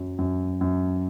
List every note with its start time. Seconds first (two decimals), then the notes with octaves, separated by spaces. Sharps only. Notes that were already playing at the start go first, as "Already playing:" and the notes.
Already playing: F#2 F#3
0.18 F#2
0.61 F#2